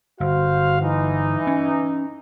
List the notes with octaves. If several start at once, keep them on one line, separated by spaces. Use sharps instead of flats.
G1 F#4 C5 F5
E3 D#4
C#4